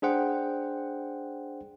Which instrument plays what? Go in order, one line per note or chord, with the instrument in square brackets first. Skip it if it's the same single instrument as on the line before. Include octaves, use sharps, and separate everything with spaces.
[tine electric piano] D4 G#4 C5 F#5 G5